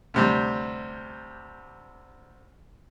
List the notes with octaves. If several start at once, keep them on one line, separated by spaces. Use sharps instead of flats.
D2 C3 G3